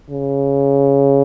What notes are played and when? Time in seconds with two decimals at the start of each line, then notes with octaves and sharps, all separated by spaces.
0.11 C#3